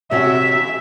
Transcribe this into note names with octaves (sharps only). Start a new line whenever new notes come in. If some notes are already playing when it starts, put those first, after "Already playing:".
C3 C#4 F#4 E5